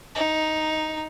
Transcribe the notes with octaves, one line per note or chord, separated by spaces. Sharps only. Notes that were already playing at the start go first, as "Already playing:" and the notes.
D#4